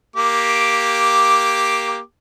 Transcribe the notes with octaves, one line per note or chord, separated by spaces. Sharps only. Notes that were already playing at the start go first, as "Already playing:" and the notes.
A#3 G4 D6